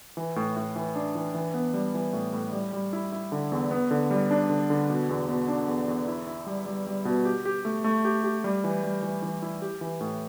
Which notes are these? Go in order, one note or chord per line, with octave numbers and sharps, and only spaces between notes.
E3
A2
A2
E3
D4
E3
E3
B3
G3
E3
A2
A2
G3
G3
E4
E4
D3
E2
B3
D3
G3
D4
D3
D3
B2
E2
B2
D4
E2
E2
E4
E4
G3
G3
G3
B2
G4
G4
A3
A3
G4
G4
G3
E3
G3
E3
E3
E4
G4
E3
A2